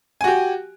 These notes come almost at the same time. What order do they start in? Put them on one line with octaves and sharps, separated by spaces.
G#5 F#4 G4